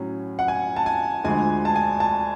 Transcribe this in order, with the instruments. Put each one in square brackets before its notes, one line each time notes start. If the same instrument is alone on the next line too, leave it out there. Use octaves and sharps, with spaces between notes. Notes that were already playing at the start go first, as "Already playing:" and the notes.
Already playing: [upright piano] A2 F#3 C#4
F#5
G#5
A5
G#5
D2 D3 F3 G#3 G#5
A5
G#5
A5